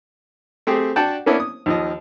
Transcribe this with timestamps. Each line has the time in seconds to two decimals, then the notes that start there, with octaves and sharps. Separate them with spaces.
0.67 A3 C4 G4 G#4
0.96 D4 F#4 F#5 G5 A5
1.26 A#3 B3 C#4 D4 E4
1.40 D#6
1.66 D#2 F3 D#5